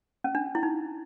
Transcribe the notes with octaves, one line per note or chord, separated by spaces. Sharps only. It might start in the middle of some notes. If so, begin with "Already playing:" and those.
C#4
D4
E4
D#4